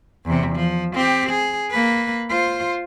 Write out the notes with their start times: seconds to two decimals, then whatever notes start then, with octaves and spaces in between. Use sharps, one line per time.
0.25 E2 C3
0.56 F3
0.95 C4 G4
1.30 G#4
1.71 A#3 B4
2.30 F4 C5